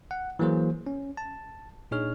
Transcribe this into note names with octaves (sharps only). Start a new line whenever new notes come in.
F#5
E3 F#3 A#3 G#4 C5
C#4
A5
A#2 D4 D#4 G#4 C#5 F6